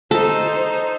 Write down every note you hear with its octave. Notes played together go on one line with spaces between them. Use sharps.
D#4 A4 C5